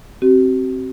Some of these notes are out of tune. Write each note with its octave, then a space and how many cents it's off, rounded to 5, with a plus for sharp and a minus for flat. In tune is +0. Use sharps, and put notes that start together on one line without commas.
C4 +10 F#4 +45